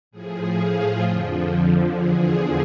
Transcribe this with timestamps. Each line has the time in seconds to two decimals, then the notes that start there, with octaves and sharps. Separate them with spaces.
0.11 A2 F3 G#4
0.57 F4
1.02 F2 D3 F3
1.94 E2 D3 F3 G#4